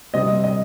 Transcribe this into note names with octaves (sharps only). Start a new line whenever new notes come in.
C3 G3 C4 D#5
D#5